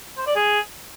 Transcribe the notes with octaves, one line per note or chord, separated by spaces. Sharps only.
C5
D5
G#4